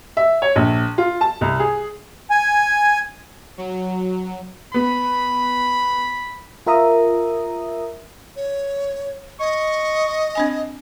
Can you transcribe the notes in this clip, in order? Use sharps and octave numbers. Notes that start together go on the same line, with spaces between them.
E5
C#5
A#1
F4
A5
C2
G#4
G#5
F#3
B3 B5
F4 A#4 E5 A#5 D#6
C#5
D#5 C#6
C4 D4 G#5